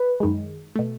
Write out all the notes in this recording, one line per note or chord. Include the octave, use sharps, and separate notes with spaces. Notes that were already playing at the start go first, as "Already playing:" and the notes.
Already playing: B4
F#2 D#3 G#3
B2 A3